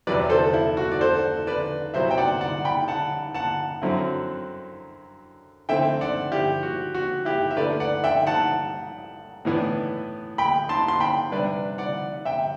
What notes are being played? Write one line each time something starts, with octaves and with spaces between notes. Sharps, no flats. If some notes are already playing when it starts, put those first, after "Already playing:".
E2 C3 F#3 B4 D5
A4 C5
E4
F#4
D5
A4 C5
B4 D5
C3 F#3 B3 E4 C5 E5
G5
D5 F#5
D5 F#5
G5 B5
F#5 A5
F#5 A5
F#2 D3 F#3 C4 E4
D3 A3 C4 E4 E5 G5
D5 F#5
E4 G4
F#4
F#4
E4 G4
E5
D3 A3 E4 B4 D5
D5 F#5
E5 G5
F#5 A5
A2 E3 B3 D4
G5 B5
A5 C6
C6
G5 B5
C3 G3 D4 B4 D5
D5 F#5
E5 G5